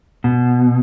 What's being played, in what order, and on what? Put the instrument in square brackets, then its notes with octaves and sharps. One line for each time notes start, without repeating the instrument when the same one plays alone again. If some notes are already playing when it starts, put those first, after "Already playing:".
[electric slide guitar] B2